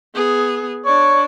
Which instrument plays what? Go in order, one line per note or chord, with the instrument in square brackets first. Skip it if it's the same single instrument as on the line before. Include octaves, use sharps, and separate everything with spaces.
[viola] B3 G#4
[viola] D4 D5 [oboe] C#5